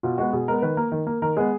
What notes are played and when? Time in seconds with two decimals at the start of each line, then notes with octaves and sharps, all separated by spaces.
0.03 B2 F4
0.18 G#3 B3 F#4
0.33 B2 G#4
0.48 G#3 B3 A#4
0.62 D#3 B4
0.77 A#3 A#4
0.92 D#3
1.07 A#3
1.22 D#3 A#4
1.37 G#3 B3 G#4